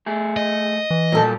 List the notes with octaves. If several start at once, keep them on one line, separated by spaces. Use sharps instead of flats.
A3 G#4
D#5
E3
A#2 F#3 G3 A4 A5